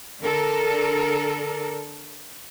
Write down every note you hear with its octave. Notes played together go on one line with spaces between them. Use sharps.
D3 A4 A#4